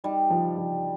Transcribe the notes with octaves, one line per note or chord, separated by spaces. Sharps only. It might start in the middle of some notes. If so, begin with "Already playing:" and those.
G3 D#4
F3
F3